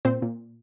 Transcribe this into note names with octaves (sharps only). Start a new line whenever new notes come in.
A#2 C4 C5
A#2